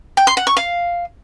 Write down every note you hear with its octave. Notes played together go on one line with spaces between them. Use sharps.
G5
C6
F#5
C#6
F5